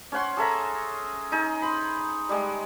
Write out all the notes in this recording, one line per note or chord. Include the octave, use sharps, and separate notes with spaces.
C#4 C#5 F#5 C6
G#4 A4 E5 A#5
D#4 G#4
B5 C6
G3 G#3